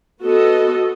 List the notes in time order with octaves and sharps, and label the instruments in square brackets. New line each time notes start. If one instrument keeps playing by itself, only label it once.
[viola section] B3 F#4 A4 D#5